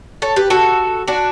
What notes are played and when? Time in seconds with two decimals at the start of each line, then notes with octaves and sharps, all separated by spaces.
0.22 A4 C#5
0.36 G4 B4
0.50 F#4 A4
1.08 D4 F#4